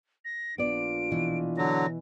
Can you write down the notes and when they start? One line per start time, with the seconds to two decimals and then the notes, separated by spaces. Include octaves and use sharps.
0.25 A#6
0.58 A#1 B3 D4 F4 D5 D7
1.11 B2 E3
1.57 D3 F#3 A#6